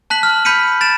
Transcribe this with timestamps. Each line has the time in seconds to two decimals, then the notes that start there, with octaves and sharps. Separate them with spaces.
0.10 A5 F#6 B6 F#7
0.23 F6
0.45 B5 G6 B6 C#7 D#7
0.81 B5 A6 D7 E7